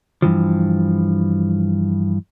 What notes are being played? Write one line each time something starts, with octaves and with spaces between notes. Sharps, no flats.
G2 E3 F3